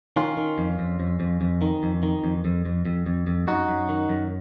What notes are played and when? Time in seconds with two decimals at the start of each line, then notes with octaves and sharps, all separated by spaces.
0.16 D#3 C#4 F4
0.37 D#3
0.58 F2
0.79 F2
1.00 F2
1.20 F2
1.41 F2
1.62 D#3
1.83 F2
2.03 D#3
2.24 F2
2.45 F2
2.65 F2
2.85 F2
3.06 F2
3.27 F2
3.47 F#2 D#4 F#4
3.68 F#2
3.89 D#3
4.09 F#2